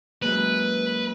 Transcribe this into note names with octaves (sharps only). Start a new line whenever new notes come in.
F#2 G#3 A#3 B4